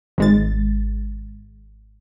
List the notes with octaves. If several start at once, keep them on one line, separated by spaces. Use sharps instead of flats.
G#1 G#3 A6